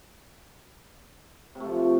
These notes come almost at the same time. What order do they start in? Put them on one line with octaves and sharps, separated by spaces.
C3 A3 F3